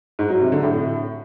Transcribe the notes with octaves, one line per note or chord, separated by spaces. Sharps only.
G#2
F#3
C3
D3
A2